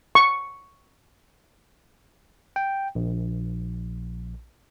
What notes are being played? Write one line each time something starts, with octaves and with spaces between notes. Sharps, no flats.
C#6
G5
A#1